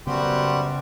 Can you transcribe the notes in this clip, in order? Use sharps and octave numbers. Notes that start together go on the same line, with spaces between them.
F#2 C#3 G3 B3 F#4 G4 C5